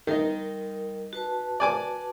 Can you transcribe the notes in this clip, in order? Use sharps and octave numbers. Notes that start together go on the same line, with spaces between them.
D#3 G3 D#4 A#4
F#4 B4 A5
D5 G#5 D6